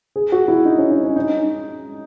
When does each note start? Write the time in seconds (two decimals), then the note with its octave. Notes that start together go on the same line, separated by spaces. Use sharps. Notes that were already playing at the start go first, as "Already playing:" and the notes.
0.16 G#4
0.32 F#4
0.48 E4
0.65 D#4
0.78 C#4
0.91 D#4
1.03 C#4
1.16 D#4